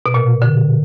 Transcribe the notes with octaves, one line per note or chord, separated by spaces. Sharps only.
B2
A#2
D3